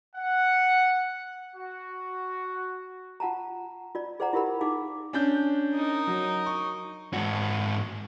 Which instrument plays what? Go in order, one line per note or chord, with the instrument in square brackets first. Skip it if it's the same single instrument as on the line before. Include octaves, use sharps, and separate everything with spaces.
[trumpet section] F#5
F#4
[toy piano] F4 F#5 A5 A#5
F4 D5
G#4 C5 D5 F#5 A#5
E4 F4 G4 A#4 F#5 B5
D#4 G#4 F5 D6
[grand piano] C#4 D4 G6
[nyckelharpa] D#4 A#4
[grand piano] F#3
C#6
[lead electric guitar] G#2 F#4